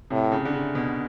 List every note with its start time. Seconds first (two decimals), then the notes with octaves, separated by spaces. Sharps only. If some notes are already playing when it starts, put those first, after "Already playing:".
0.10 A2 C3
0.32 C#3
0.45 D3
0.53 C#3
0.75 B2